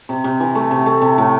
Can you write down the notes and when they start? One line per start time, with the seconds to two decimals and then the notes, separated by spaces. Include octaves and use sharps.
0.09 C3
0.24 C3
0.40 E3
0.55 A3
0.71 C3
0.86 A3
1.02 C3
1.18 A2